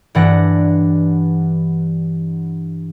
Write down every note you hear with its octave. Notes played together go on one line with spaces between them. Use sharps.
G2 E3 D4 F#5 A#6